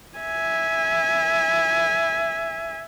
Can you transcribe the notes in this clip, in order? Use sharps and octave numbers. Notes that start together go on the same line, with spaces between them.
E5 G#5